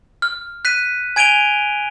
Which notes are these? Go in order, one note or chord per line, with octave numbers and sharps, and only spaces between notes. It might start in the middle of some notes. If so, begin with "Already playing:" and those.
F6
F#6 B6 D#7
G#5 G#6 D7 D#7 F7 G7